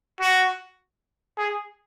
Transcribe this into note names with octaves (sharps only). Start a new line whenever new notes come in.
F#4
G#4